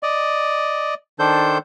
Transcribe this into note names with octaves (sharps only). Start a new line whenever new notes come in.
D5 D#5
D#3 D4 A4 C5 G6